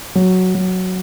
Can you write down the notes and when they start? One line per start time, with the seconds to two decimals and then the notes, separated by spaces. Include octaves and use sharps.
0.15 F#3
0.55 F#3